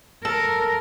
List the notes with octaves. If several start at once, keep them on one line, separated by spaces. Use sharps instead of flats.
A4 A#4